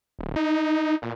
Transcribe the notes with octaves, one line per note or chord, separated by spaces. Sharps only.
D1
D#4
A#2